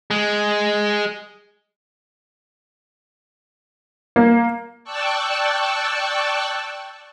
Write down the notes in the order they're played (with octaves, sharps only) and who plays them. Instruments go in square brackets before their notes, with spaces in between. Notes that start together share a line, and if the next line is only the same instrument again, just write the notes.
[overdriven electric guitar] G#3
[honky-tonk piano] A#3
[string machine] D5 G5 A5 C#6 E6 F#6